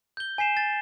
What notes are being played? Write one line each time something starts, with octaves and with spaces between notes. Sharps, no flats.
G6 G7
G#5 B6 C7 E7
A6